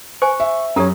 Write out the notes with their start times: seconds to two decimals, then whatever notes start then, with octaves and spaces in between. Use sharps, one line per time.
0.22 C5 G#5 C#6
0.40 E5
0.76 F#2 C#4 G4 A4 C#5 A#5